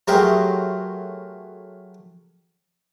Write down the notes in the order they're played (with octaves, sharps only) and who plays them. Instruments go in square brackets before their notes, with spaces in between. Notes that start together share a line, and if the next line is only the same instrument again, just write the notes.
[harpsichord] F#3 A3 G4 G#4 A#4 C5